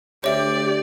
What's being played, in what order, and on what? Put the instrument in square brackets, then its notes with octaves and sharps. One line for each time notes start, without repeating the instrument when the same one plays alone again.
[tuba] D2 [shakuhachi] G4 [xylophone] C#5 E5 [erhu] D5